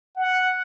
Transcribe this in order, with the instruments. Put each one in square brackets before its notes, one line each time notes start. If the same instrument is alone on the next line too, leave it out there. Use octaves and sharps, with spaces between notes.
[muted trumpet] F#5